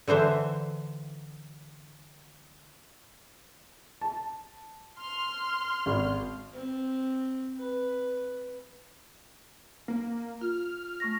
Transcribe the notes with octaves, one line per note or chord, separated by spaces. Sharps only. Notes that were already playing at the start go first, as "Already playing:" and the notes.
D3 E3 C5 E5
A5
C6 F6
G#1
C4
B4
A#3
F4 F6
A3 C#6 A#6